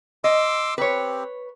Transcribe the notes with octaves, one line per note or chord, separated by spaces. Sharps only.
D#5 C6 D6 E6
C4 G4 B4 C#5